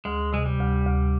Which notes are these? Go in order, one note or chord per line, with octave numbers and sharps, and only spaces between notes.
D2 G#3
C3 G#3
G3
D2
D2